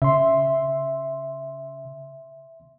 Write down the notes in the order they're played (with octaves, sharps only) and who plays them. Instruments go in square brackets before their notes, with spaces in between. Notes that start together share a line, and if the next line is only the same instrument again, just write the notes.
[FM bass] C#3 [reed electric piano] E5 C6